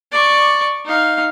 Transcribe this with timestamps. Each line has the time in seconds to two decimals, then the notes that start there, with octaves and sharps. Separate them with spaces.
0.11 D5 C#6
0.85 D#4 F5